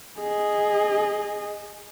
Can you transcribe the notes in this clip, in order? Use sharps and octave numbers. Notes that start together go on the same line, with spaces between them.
G#4 D#5